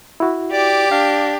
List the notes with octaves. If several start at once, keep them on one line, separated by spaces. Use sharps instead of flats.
E4 F#4
G4 D5
D4 F5